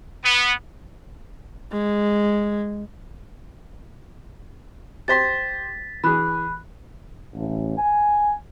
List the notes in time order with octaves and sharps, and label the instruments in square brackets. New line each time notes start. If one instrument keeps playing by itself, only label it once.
[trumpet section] B3
[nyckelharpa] G#3
[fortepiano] G4 C5 C6 [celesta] A6 B6
[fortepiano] E3 G#4 [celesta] B5 F#6
[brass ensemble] A1
G#5